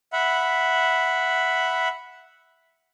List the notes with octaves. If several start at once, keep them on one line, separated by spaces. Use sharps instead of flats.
E5 F#5 B5